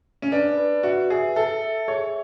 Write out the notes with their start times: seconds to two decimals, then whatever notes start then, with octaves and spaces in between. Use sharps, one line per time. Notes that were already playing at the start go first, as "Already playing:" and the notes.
0.22 C#4
0.32 D4 B4
0.57 B4
0.83 F#4 E5
1.10 G#4 E5
1.36 A4 E5
1.62 E5
1.88 G#4 C#5